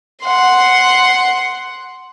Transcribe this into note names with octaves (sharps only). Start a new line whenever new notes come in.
F#5 C6